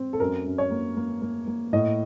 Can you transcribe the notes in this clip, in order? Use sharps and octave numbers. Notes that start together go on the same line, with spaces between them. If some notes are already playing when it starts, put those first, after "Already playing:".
Already playing: C4
A4
F#2 A#4
F#2
C#5
A#3
A#3
A#3
A#3
A2 D#5